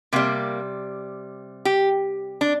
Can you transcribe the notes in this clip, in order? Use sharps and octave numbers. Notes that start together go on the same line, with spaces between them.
C3 G3 A#3
G4
D4